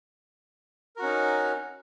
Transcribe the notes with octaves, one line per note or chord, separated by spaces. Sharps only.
C#4 D#4 F#4 A#4